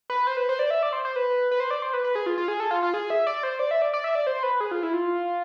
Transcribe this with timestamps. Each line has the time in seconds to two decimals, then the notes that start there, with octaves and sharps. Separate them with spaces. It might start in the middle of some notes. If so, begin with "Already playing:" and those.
0.10 B4
0.27 C5
0.37 B4
0.49 C5
0.59 D5
0.71 E5
0.83 D5
0.93 C5
1.05 C5
1.16 B4
1.51 B4
1.60 C5
1.71 D5
1.82 C5
1.93 B4
2.04 B4
2.15 G#4
2.26 F4
2.38 F4
2.48 G#4
2.60 A4
2.71 F4
2.83 F4
2.94 G#4
3.10 E5
3.27 D5
3.43 C5
3.59 D5
3.71 E5
3.82 D5
3.93 D5
4.04 E5
4.15 D5
4.27 C5
4.43 B4
4.60 G#4
4.71 F4
4.83 E4
4.93 F4